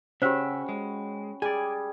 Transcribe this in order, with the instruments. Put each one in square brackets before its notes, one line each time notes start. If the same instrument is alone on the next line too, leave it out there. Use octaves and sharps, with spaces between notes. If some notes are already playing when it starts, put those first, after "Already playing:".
[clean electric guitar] C#3 E5 [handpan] C#4 [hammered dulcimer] F#4 G5 B5 [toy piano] G4 C5
[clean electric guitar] G#3
[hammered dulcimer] G3 [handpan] G#4 [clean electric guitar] D5 G#5